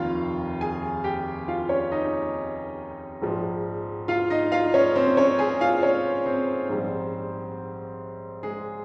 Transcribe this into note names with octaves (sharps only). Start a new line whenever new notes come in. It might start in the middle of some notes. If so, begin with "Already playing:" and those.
Already playing: F1 D#2 D#3 F4 F5
G#4 G#5
G4 G5
F4 F5
C#4 C#5
D#4 D#5
A#1 G#2 F3 G#3
F4 F5
D#4 D#5
F4 F5
C#4 C#5
C4 C5
C#4 C#5
G#4 G#5
F4 F5
C#4 C#5
C4 C5
A#1 G#2 G3
G#3 G#4